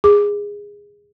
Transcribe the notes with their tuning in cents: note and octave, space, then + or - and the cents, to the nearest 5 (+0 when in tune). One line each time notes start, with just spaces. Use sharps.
G#4 -15 D6 +0